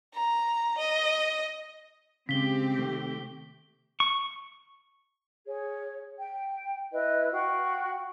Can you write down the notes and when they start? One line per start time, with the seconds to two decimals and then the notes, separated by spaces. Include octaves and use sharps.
0.14 A#5
0.78 D#5
2.29 C#3 G#3 C4 G4 B6 G7
2.78 C3 D#3 A3
4.00 C#6
5.46 G#4 C#5
6.15 G5
6.91 E4 B4 D#5
7.32 F#4 F5 G5 C#6